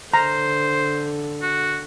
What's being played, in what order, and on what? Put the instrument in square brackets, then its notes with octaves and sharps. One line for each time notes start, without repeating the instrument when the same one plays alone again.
[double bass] D3 [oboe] C5 [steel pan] A#5
[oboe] F#4